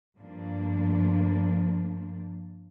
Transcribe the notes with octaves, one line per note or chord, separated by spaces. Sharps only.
G2 F3 A#3 D4